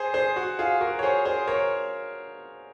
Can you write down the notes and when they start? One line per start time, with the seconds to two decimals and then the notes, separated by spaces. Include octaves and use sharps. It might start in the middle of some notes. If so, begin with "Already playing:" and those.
Already playing: G#4 C5
0.14 G#4 C5
0.36 F#4
0.59 F4 G#4
0.81 F#4 A#4
0.99 C#5
1.03 G#4 C5
1.25 G#4 C5
1.47 A#4 C#5